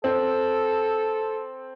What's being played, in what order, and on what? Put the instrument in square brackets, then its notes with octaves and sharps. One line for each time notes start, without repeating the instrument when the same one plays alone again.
[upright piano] C4 [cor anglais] A4